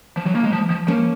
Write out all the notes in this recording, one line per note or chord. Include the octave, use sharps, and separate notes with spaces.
F3
F#3
A#3
G#3
F3
F3
F3 A#3 C#4